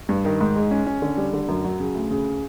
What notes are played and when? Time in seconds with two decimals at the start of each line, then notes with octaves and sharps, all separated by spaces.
0.09 G2
0.25 D#3
0.41 G#2
0.56 G#3
0.71 C#4
0.87 C#4
1.02 D3
1.17 G3
1.33 D3
1.48 F#2
1.64 F#3
1.80 C#3
1.95 D2
2.11 C#3